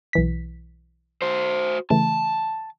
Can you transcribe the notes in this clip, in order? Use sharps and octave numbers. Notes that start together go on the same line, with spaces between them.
B1 E3 B6
F#4 C5
C#3 E3 A3 A5